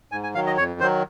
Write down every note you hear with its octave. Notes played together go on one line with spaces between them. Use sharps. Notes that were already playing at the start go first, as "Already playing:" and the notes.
G#2 G#5
G#5
D#3 F#3 F5
D#5
F2 C#5
D#3 F#3 C5